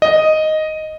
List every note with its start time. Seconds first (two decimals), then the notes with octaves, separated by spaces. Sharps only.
0.02 D#5